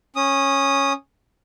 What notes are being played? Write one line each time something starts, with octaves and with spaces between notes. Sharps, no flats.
C#4 D#6